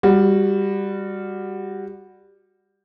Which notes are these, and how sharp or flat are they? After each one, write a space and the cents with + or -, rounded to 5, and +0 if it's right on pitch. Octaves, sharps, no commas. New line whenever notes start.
G3 +15 F#4 +0